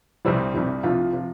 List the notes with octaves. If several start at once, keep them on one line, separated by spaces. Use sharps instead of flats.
C2 C3 G3 C4
C2 C3 G3
C2 C3 F3 F4
C3 F3